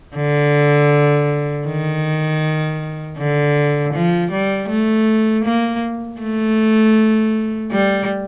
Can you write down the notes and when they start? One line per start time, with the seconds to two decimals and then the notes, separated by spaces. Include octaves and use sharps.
0.16 D3
1.67 D#3
3.18 D3
3.94 F3
4.32 G3
4.69 A3
5.45 A#3
6.20 A3
7.71 G3